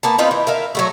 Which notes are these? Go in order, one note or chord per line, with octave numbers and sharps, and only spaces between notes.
A#3 B3 A5
C4 D#4 F4 B4
E3
A#4 E5 F5
F#3 G3 A3